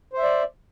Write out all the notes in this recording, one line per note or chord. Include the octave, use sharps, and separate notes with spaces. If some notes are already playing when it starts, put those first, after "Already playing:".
C5 D5 E5